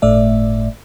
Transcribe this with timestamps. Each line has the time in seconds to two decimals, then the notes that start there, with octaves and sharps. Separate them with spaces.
0.02 G1 A2 A3 D5 E5